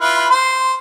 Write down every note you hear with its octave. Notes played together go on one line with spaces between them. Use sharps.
E4 F4 B4
C5